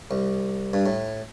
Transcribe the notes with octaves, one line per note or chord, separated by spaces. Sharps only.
C2
G2
A2